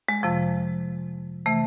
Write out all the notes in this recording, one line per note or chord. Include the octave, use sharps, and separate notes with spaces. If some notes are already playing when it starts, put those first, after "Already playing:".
G#3
F2 C3 F3
C3 E3 A3